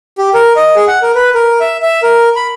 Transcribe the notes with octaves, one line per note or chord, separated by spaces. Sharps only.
G4
A#4
D#5
G#4
F#5
A#4
B4
A#4
E5
E5
A#4
B5